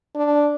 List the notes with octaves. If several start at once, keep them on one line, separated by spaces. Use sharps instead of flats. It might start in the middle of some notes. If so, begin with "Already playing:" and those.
D4